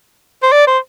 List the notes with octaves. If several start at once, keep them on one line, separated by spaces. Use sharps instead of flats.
C5
D5
C5